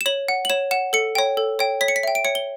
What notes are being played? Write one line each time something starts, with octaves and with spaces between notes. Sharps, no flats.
E7
C#5 F#7
F#5
F#7
C#5 E7
F#5 E7
A4 C#7
C#5 G5
A4
C#5 G5
C#5 B6
C#7
B6
E5 G5
D7
C#5 C#7
G7